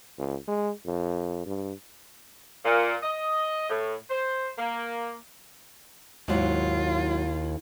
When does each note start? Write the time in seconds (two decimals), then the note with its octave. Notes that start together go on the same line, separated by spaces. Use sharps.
0.19 C#2
0.48 G#3
0.86 F2
1.46 G2
2.65 A#2
3.03 D#5
3.70 A2
4.10 C5
4.58 A#3
6.28 D#2 G#2 F#3 E4 F4